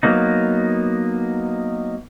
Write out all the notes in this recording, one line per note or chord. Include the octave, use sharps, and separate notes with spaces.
F#3 A#3 B3 D#4